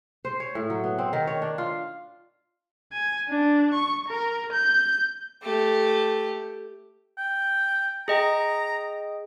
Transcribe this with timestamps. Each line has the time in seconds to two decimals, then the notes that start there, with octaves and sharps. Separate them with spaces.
0.25 C5
0.40 C#5
0.55 A2
0.70 F#3
0.84 B3
0.98 C4
1.13 D#3
1.27 C#5
1.42 D4
1.58 F4
2.92 G#5
3.29 D4
3.74 C#6
4.08 A#4
4.53 G6
5.43 A3 G4
7.18 G5
8.08 G#4 D#5 G5 A#5